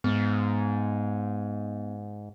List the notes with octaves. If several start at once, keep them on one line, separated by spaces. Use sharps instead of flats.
G#2 B3